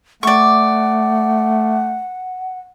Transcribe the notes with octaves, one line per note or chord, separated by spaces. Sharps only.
A3 D5 F#5 C#6